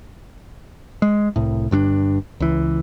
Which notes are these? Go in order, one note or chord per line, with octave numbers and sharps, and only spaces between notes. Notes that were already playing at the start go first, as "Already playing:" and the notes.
G#3
C2 A2
G1 G2 C#4 D4
C#2 E3